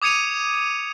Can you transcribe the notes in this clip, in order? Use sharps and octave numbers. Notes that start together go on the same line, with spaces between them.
D6 D#6 G#6 C#7 D#7 F7